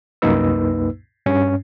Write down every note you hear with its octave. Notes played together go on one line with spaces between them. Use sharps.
C2 F#2 A#3 D#4 B4 E6
G2 C#4